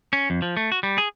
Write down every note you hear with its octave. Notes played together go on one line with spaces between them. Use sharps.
C#4
F2
F3
A3
F#4
G3
G#4